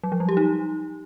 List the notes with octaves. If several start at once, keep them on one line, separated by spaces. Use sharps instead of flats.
F#3
F3
G3
G4
D#4